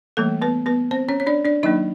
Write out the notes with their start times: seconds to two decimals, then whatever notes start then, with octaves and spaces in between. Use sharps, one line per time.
0.17 E3 G3 A3 A#3 A4
0.42 B3 B4
0.66 B3 B4
0.91 C4 C5
1.09 C#4 C#5
1.20 C#5
1.27 D4 D5
1.45 D4 D5
1.63 D#3 F#3 A#3 D4 D#4 D#5